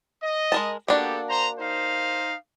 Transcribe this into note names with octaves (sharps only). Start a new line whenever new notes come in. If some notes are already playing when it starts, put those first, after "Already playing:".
D#5
G#3 A#4 A5
A#3 B3 D4 F#4 G4 A4
C5 A#5
D#4 C5 F5